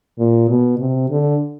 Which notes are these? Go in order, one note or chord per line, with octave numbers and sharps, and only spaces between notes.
A#2
B2
C3
D3